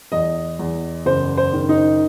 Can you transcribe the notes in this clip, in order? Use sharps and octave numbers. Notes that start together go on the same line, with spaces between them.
E2 D#5
E2
F#1 C5
C5
D#3
D#4